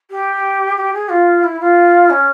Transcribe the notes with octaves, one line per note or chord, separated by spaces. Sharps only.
G4
G4
G#4
F4
E4
F4
C#4